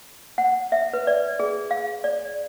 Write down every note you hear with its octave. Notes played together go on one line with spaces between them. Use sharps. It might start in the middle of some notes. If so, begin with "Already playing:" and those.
F#5
E5
B4
D5
G#4
F5
D5